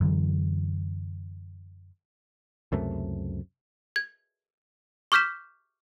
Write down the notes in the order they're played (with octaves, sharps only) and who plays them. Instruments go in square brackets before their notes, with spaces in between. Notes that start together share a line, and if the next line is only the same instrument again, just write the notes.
[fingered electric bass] F#2 D3 E3
[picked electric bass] C#2 F#2 C3 A3
[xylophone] G#6
C#6 D6 F6 G6 B6 E7